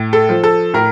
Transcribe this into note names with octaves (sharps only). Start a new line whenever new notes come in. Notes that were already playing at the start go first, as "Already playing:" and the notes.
Already playing: A2
A4
F3
A4
A2 A#4